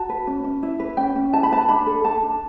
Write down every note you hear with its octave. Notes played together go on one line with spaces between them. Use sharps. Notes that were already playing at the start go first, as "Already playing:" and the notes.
Already playing: F#4 A5
B4
C#4
C#4
E4
B4
C#4 G5
C#4
E4 A5
B5
B4 A5
D4 B5
A4
A4 A5
D4